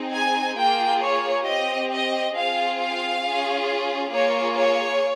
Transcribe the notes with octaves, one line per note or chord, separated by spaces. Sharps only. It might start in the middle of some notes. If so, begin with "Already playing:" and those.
Already playing: C4 D#4 G#4
G#5
A#3 F4 G#4 G5
C#5
C4 G4 D#5
D#5
C4 F4 G#4 F5
F5
C#4 F4 G#4
A#3 F4 G#4 C#5
C#5